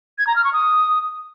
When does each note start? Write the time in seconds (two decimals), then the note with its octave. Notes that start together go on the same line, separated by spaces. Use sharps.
0.18 G#6
0.27 A#5
0.36 F6
0.44 C#6
0.53 D#6